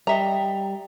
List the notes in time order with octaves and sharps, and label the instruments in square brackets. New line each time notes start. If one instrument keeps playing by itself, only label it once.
[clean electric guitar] G3 [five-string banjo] D#5 E5 A#5